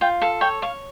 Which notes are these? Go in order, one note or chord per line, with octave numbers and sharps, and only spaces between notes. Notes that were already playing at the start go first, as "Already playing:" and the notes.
F4 G5
A4 F5
C#5 G5
C#5 F5